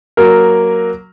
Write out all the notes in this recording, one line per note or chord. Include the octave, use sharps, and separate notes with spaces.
F#3 A#3 A#4